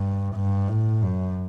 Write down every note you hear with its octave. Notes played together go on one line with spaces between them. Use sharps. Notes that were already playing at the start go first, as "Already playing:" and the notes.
Already playing: G2
G2
A2
F#2